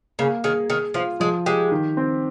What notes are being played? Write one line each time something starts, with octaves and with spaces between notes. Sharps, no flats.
C#3 A#3
D#3 G#4
D#3 G#4
F3 F4
F3 G#3
G#3 G4
D#3
C4